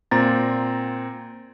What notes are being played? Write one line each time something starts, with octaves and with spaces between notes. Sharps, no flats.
A#2 C4 A#5 A6